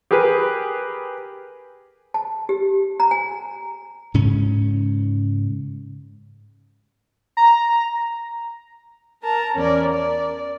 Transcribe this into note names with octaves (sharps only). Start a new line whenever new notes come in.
G4 G#4 A#4 B4
A5
G4
A#5
G#5
G#2 C#3 C#4
A#5
A#4 A5 A#5
E2 C#4 A#4 D5
D5